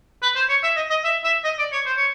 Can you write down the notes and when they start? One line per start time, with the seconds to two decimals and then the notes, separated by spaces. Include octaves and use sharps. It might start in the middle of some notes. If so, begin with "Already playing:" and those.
0.22 B4
0.35 C5
0.49 C#5
0.63 E5
0.76 D#5
0.90 D#5
1.04 E5
1.24 E5
1.44 D#5
1.59 D5
1.72 C#5
1.86 C5
1.97 C#5